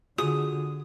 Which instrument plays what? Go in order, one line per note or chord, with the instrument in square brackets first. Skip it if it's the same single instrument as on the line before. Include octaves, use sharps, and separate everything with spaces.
[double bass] D3 [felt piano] F4 F#4 G#4 [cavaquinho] D#6